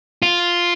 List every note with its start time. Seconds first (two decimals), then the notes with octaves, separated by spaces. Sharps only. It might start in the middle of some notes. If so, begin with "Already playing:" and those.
0.22 F4